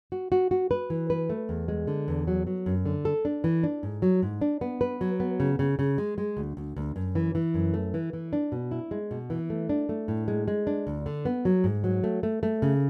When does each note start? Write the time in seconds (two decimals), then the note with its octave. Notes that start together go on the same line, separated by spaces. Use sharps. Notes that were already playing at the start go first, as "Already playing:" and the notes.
0.12 F#4
0.32 F#4
0.51 F#4
0.71 B4
0.90 E3
1.10 B4
1.30 A3
1.49 E2
1.68 G#3
1.87 D3
2.08 E2
2.28 F#3
2.47 F#3
2.66 F#2
2.85 D3
3.05 A4
3.25 D4
3.44 E3
3.63 D4
3.83 G#2
4.02 F#3
4.22 G#2
4.41 D4
4.61 B3
4.81 B4
5.01 F#3
5.20 B3
5.40 C#3
5.59 C#3
5.79 C#3
5.98 G#3
6.18 G#3
6.37 D2
6.57 D2
6.76 D2
6.96 F#2
7.15 E3
7.35 E3
7.54 F#2
7.74 A3
7.94 E3
8.13 E3
8.33 D4
8.52 B2
8.71 E4
8.91 G#3
9.11 B2
9.30 E3
9.50 A3
9.69 D4
9.89 A3
10.08 A2
10.28 G#3
10.48 G#3
10.67 D4
10.87 D2
11.06 D3
11.25 B3
11.45 F#3
11.64 G#2
11.84 F#3
12.04 A3
12.23 A3
12.43 A3
12.62 C#3